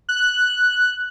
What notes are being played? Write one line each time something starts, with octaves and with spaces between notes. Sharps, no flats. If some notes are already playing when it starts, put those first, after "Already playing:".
F#6